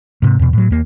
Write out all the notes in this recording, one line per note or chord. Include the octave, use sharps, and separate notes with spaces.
G#2 C3
E2 B2
A2 F#3
D#2 A#3